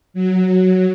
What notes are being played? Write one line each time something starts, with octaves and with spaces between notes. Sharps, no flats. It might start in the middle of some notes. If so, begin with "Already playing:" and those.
F#3